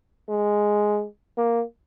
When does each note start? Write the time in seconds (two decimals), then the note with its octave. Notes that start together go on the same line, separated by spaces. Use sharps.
0.29 G#3
1.37 A#3